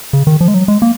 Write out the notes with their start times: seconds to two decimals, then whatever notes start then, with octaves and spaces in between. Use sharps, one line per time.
0.13 C#3
0.27 D#3
0.41 F3
0.48 G#3
0.54 F#3
0.68 G#3
0.82 A#3